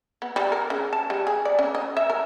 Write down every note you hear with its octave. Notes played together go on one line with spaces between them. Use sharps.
B3
G3
A#4
C#3
A5
G3
G#4
D5
C#4
D#5
E5
A#4